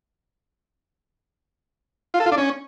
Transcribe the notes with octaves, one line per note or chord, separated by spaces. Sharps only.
F4
A4
F4
D4
C#4